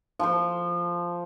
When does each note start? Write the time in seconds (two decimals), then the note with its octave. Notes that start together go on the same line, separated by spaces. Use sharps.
0.19 F3 C5